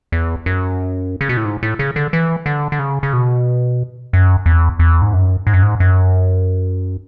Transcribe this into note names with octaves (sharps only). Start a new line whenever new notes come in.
E2
F#2
C#3
B2
A2
G#2
A2
C#3
D3
E3
D3
D3
C#3
C#3
B2
F#2
E2
E2
G#2
F#2
G#2
F#2
G#2
F#2